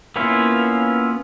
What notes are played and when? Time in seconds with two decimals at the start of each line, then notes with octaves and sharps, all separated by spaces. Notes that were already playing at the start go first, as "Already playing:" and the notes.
0.16 A#3 B3 C#4 E4 F4